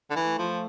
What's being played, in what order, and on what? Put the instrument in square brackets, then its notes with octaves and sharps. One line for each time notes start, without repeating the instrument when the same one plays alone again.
[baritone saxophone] D3
[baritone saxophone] E3 [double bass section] A3
[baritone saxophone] F3